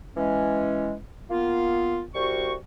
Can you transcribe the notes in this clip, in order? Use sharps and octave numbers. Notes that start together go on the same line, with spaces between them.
E3 G#3 C#4
A#3 B3 F4
C2 G3 F#4 C5 C#6